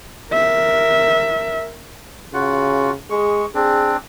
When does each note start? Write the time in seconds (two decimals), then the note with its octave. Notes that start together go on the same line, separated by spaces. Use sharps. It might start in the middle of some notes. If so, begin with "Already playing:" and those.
0.33 A#4 E5
2.34 C#3 F4 F#4 F#5
3.10 G#3 G#4 C#6
3.55 C4 D4 G#4